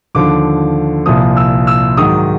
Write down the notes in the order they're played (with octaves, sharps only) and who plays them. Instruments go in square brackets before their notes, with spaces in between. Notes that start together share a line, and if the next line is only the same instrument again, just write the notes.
[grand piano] D#2 D3 F3 D6
C2 A#2 F3 D#6
E6
E6
G#2 D#3 F#3 D#6